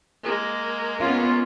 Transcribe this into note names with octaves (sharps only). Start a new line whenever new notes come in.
G#3 A#3
B3 C#4 F4